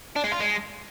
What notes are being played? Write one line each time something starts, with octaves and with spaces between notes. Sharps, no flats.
D4
G#3
F4
G#3